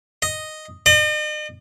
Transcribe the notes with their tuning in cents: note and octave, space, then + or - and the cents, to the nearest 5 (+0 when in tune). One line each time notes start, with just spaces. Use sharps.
D#5 -5
D#5 -45